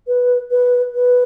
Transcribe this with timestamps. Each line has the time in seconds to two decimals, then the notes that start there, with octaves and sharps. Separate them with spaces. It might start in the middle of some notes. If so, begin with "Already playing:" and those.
0.08 B4
0.51 B4
0.95 B4